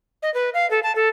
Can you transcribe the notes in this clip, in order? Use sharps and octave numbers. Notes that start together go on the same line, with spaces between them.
D#5
B4
F5
A4
A5
A4